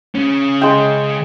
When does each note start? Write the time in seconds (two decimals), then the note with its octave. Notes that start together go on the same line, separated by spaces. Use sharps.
0.15 C#3 C#4
0.61 G#3 G5